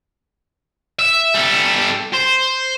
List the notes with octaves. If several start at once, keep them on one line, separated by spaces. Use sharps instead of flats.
E5
G3 A4
C5